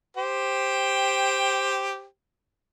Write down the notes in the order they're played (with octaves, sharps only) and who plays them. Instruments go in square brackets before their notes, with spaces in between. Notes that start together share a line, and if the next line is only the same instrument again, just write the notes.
[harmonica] G4 C5 G5